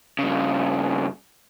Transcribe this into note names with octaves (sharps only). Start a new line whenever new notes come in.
G2 C#3